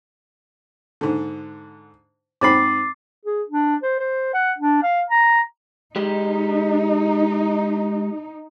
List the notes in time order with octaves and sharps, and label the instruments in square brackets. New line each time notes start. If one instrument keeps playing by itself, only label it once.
[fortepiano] G#2 D3
[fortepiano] G#2 C4 B5 [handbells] D6 A6 C7
[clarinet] G#4
D4
C5
C5
F#5
D4
F5
A#5
[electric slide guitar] G#3 G4 [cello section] D#4